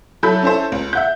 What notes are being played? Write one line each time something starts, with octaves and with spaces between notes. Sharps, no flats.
F#3 E4 A4 B5 G6
C#4 E4 A4 C5
C#2
E5 F#5 G6